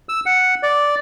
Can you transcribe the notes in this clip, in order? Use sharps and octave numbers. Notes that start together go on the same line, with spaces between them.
E6
F#5
D5